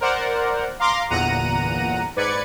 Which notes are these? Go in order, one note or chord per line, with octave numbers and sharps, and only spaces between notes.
A#4 C5 D5 F#5
F5 A#5 C6 D6 A#6
G1 E2 A#2 F#5 A#5 D#7
G#2 B4 D5 G#6 C#7